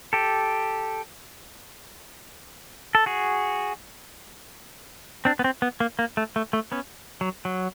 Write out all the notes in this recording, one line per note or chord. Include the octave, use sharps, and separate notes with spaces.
G4 A4
A4
F#4 G#4
C4 D4
B3
C4
B3
A#3
A#3
A3
A3
A3
B3 C#4
F#3
F#3